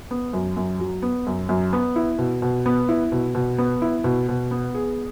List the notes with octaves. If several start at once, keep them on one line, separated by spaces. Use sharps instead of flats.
B3
F#2
F#2
F#3
B3
F#2
F#2
B3
E4
B2
B2
B3
E4
B2
B2
B3
E4
B2
B2
B3
G#4